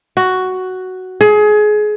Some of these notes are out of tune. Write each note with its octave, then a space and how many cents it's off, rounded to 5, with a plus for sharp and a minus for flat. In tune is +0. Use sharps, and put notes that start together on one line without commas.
F#4 +5
G#4 +25